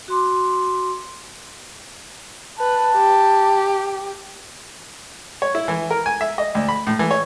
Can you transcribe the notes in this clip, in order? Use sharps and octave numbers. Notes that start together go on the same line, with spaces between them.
F#4 C6 D6
B4 A5
G4
C#5
E4
E3
A#4
G#5
E5
D#5
D2
B5
A2
E3
C#5